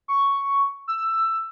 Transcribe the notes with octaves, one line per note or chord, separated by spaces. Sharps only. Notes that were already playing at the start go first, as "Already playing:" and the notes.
C#6
E6